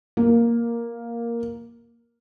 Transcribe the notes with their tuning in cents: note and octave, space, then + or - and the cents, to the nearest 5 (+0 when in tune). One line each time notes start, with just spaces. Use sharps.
A#3 +5